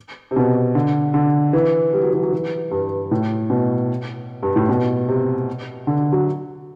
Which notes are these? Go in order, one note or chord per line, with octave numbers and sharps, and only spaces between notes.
C3
B2
D3
D3
E3
G3
F#3
E3
F#3
E3
G2
A2
B2
G2
A2
B2
C3
D3
F#3